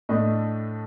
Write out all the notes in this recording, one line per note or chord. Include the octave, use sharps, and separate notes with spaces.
A2 A3 D4 D#5